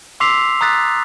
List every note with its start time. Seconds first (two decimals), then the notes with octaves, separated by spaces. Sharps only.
0.20 C6 D6 E6 B6 C7 F7
0.61 A#5 D#6 F#6 A6 B6